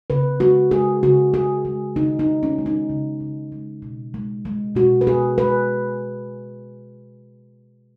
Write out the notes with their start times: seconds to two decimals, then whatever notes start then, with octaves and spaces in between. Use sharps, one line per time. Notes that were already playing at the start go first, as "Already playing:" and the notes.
0.10 C#3 B4
0.40 G#3 F#4
0.71 G#3 G#4
1.03 C#3 F#4
1.34 C#3 G#4
1.65 G#3
1.96 C#3 D#4
2.19 D#4
2.27 G#3
2.43 C#4
2.58 G#3
2.66 D#4
2.90 C#3
3.20 C#3
3.52 G#3
3.82 B2
4.14 G#3
4.45 G#3
4.75 B2 F#4
5.01 B4
5.07 B2 G#4
5.38 G#3 B4